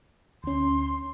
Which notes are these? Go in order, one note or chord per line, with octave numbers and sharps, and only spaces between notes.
D2 C#4 C6